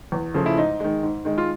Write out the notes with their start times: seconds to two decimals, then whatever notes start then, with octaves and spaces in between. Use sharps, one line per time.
0.12 E2
0.34 C#3 F3 A3
0.46 E4
0.57 G#2 D#4
0.80 D#3 G#3
1.03 G#2
1.25 D#3 G#3
1.38 F4